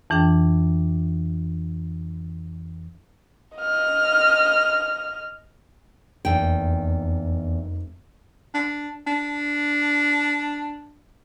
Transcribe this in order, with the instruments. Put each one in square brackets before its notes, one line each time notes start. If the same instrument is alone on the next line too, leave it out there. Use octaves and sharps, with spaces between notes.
[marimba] F2 E3 D4 G#4 G5
[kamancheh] D#5 F6
[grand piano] F1 A#3 [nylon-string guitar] E2 G5
[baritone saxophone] D4
D4